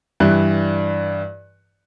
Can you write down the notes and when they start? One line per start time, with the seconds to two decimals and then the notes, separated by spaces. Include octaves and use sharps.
0.20 G2 E3 F#6